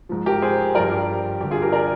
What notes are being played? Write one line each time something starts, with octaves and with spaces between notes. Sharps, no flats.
G#2 F3
G4 A#4
G#4 C5
G2 F3 A#4 D5
G4
G2 D3 G3 G4
F4 G#4
G4 A#4
A#4 D5